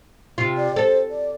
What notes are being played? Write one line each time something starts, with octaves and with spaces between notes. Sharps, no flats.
C3 F4
D5
A4 C5
D5